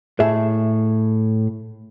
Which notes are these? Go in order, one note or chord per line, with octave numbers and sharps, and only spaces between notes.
A2 G#4 E5